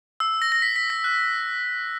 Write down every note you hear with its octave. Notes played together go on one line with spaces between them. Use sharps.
E6
A#6
A#6
B6
B6
A#6
F#6